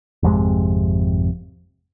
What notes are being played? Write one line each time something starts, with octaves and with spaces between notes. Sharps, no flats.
G#1 F2 C3 G#3